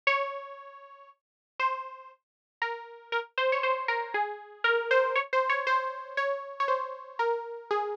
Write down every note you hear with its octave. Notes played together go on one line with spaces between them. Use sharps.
C#5
C5
A#4
A#4
C5
C#5
C5
A#4
G#4
A#4
C5
C#5
C5
C#5
C5
C#5
C#5
C5
A#4
G#4